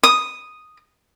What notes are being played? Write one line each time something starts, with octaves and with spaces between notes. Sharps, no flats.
D#6